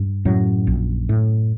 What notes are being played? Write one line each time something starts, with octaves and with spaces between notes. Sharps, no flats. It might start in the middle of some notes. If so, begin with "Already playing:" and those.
Already playing: G2
F#2 A2 F#3
A#1
A2